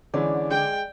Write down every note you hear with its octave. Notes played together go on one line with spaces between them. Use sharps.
D3 E3 G#3 C#4 D5
G#3 G5